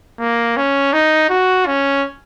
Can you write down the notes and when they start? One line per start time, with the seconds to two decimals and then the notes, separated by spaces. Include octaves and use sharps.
0.20 A#3
0.57 C#4
0.93 D#4
1.30 F#4
1.67 C#4